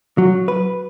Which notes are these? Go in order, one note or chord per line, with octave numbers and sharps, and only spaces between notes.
F#3
B4